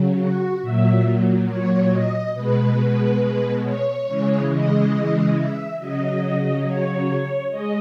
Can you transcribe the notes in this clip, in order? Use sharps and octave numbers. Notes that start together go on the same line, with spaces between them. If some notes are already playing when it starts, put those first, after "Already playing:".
Already playing: C#3 F#3
F#4
A#2 F#3 E5
C#5
D#5
B2 G#3 B4
C#5
C#3 E3 G#3
D#5
E5
C#3 F#3 D#5
C#5
G#3 D#5